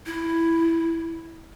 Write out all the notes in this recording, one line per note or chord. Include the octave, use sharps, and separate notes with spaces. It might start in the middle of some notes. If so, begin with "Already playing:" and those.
E4